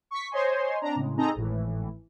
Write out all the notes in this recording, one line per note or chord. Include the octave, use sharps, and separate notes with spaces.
C#6 B6
C5 C#5 D#5 G#5 C6
C4 D4 A#5
A2 C#3 G#3
C4 D#4 G#4 A4 D#5 A#5
G#1 A2 E3